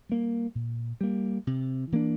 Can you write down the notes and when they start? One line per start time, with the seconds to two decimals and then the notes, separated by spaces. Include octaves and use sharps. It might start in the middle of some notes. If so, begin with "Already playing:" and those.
0.09 G3 A#3
0.55 A#2
1.01 G3 A#3
1.47 C3
1.92 E3 A#3 D4